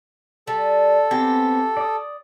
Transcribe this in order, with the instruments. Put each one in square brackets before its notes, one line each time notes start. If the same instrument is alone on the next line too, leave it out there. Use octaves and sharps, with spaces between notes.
[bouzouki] G3 [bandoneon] A4
[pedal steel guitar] B3 C4 G#5 [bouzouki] G4
[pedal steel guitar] D5 D#6